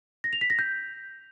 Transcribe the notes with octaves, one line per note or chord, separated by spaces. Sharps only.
A#6
F7
B6
A#6
G6